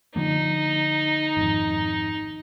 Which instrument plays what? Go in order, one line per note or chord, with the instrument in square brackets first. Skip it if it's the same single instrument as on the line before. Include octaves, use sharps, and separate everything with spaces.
[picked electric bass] D3 F3 A#3 [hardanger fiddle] D#4
[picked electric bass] G#1 F2